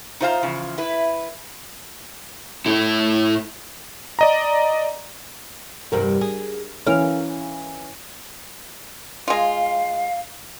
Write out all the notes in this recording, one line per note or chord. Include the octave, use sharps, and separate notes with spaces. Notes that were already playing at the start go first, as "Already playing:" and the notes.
D#4 F4 C5 D#5 F5 A#5
E2 C#3 F3
E4 B4
A2 E4
D5 D#5 A#5
E2 G2 C3 A#4
G#4
E3 C#4 A#4 F5
G#3 F4 F5